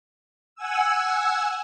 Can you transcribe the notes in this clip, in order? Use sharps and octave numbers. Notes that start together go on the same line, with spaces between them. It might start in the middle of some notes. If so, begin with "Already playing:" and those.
F#5 G#5 E6